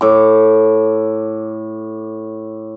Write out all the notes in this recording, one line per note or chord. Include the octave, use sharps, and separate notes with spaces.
A2 D6